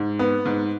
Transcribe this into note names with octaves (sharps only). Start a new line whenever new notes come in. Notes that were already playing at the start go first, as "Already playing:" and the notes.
Already playing: G#2
B3
G#2